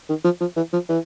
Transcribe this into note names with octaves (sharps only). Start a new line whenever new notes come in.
D#3
F3
F3
E3
F3
E3